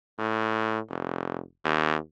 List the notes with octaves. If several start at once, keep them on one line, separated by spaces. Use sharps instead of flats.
A2
F1
D#2